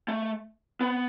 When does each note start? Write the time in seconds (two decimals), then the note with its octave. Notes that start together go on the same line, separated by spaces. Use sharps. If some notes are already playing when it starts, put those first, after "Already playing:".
0.08 A3
0.81 B3